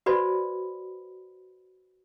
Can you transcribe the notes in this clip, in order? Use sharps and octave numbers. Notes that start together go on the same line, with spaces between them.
F#4 B4 C5 D5 B5